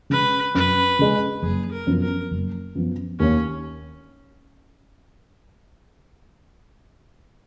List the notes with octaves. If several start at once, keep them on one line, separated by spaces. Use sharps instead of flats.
C#3 G#3 B4
F#2 B4
C#3 G#3
F#1 G#4
A#4
F#2 F3 B3
A#4
F#1
F#2 F3 B3
D#2 C#4